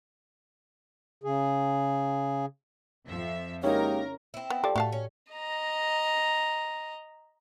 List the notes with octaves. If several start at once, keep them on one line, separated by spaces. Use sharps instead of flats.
C#3 G#4
F2 F3 E5
C#3 G#3 A#3 C#4 D#4 E4 G4 A#4
C4 E4
B3
F3 G4 A4 D5
A2 A3 F#4 F5 A5
C#4
D#5 A#5